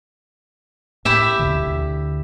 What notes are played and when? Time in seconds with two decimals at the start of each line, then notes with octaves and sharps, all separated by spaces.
1.05 A2 E4 G4 E5
1.39 D#2 B2 D3
1.63 D2